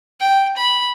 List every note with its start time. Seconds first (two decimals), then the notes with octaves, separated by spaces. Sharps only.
0.21 G5
0.57 B5